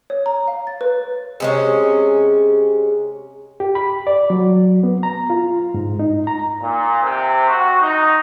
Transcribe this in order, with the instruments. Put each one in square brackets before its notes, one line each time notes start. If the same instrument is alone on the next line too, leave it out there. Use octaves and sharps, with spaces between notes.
[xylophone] C#5
A#5
F5
A6
B4
[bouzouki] C3 G#3 C#4
[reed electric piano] G4
B5
D5
F#3
B3
A#5
F4
G#2
D#4
A#5
[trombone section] A#2
C3
F#4
D#4